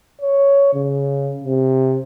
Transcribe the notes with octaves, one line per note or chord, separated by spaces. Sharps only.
C#5
C#3
C3